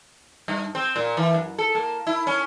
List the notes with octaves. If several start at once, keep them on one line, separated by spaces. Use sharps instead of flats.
G2
C4
A#2
E3
F#2
A4
A#3
E4
C#4